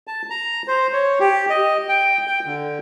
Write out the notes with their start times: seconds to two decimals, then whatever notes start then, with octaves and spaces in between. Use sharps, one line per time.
0.07 A5
0.30 A#5
0.68 C5
0.93 C#5
1.20 G4
1.50 D#5
1.89 G5
2.27 G5
2.46 D3